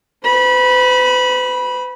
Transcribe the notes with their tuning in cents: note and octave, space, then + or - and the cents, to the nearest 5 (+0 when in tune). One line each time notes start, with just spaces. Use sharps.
B4 +45 B5 -20